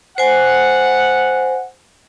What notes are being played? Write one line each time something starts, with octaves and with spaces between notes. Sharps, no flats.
C5 F#5 G#5